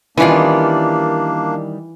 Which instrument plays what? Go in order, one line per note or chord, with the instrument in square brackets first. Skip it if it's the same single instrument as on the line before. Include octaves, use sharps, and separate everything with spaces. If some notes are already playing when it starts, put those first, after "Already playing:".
[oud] D#3 G3 C#4 [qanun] E3 F4 [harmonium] A#3 D4